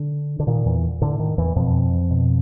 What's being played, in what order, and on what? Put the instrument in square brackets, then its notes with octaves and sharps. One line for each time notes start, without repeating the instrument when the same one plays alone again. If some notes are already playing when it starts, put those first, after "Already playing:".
Already playing: [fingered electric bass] D3
D3
A#2 D#3
E2 E3
A2 D3
D#3
E2 E3
F2 B2 F3
B2